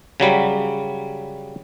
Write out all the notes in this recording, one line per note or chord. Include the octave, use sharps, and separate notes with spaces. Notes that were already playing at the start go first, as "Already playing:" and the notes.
C#3 F#3 G3